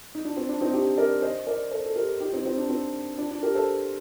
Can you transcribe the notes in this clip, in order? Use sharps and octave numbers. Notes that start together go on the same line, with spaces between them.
D#4
D4
C4
D4
C4 D#4
D#4 G4
A#4 D5
C5 D#5
A#4 D5
A4 C5
A4
G4 A#4
D#4 G4
C4 D#4
C4 D#4
D4
C4
D4
D4
G4 A#4
A4 C5